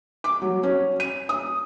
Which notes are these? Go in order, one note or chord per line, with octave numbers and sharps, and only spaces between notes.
D6
F#3
C#4
D#7
D#6